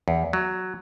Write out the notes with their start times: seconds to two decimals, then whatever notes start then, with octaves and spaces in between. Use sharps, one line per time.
0.08 E2
0.33 F#3